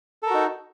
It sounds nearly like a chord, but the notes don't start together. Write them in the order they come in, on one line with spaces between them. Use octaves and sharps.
A4 A#4 F#4 D#4